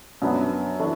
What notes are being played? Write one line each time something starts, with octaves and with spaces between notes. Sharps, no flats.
F#2 F#3 B3 D4
E3 D4 F#4 A4